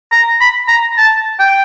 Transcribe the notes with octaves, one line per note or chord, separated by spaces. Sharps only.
A#5
B5
A#5
A5
G5